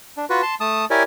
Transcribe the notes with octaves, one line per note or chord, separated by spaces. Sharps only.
D4
F4 F#4 B4
A5 C6
A3 A5 D#6
E4 G4 A#4 C#5 D5 G#5